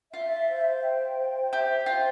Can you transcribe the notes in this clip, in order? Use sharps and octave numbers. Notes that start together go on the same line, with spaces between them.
F4 E5
C5
G5
C5
G4 E5
F4 C5